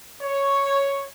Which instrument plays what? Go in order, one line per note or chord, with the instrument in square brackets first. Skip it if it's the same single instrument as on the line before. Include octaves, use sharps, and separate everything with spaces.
[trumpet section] C#5